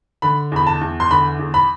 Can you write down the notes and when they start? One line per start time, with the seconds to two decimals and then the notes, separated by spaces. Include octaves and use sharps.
0.22 D3 B5
0.52 E2 B5
0.67 A5
0.81 E2
1.00 C6
1.11 D3 B5
1.39 E2
1.54 B5